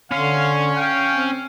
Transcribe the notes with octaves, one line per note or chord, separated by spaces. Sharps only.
D3 C#4 F5 C6
F5 G5
C4